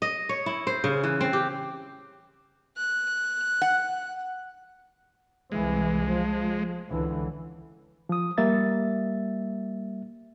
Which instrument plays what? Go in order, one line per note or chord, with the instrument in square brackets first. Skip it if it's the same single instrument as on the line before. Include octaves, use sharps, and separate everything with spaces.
[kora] D#5
C#5
E4
C5
C#3
E3
C4
G4
[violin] F#6
[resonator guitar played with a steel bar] F#5
[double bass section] C2 E3 [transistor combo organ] G#3
[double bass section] F3
C#2 D3 E3
[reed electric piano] F3 D#6
G3 A#3 E5 A6